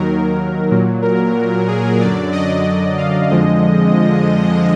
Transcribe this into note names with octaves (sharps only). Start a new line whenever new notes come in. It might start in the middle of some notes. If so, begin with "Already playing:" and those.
Already playing: D#2 D#3 F#3 A#4
A#2 F#3
A#4
G#4
F#2 D3 F#3 D5
D#5
F5
F2 D3 F3 G#3 D#5